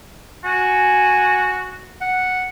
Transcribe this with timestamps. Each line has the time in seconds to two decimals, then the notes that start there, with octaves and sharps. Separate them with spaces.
0.45 F#4 G#5
2.01 F#5